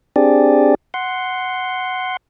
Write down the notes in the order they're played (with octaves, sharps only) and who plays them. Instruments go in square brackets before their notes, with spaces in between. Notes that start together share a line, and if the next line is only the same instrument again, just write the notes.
[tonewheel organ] C4 D4 G4 G#4 D5
F#5 C6